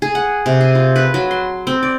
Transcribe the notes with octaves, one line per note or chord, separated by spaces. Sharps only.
G#4
F#5
C3
G#4
F4
B4
F#3
C6
C4
D5